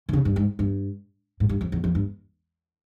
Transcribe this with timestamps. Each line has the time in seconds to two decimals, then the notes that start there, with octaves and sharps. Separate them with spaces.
0.09 E3
0.13 C#3
0.25 G2
0.36 G#2
0.59 G2
1.40 G#2
1.49 G2
1.61 F2
1.72 E2
1.84 F2
1.95 G2